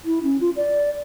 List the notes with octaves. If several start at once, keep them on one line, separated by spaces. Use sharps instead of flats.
E4
C#4
F4
D5